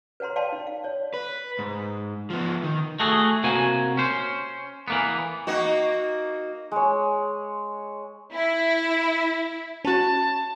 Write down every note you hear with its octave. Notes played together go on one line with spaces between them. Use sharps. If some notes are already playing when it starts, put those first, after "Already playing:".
B4 C#5 F#5 A#5 C6
D5 F5 G5 A5 C6
D#4
F5
C#5 D5
B4
G#2
F3 B3
D#3
A3 F#4 G#4
C3 A#3 F#4 G#5
C#4 C5
E3 A#3 B3
A#3 D#4 F#4
G#3 C#5
E4
C#4 F#4 A5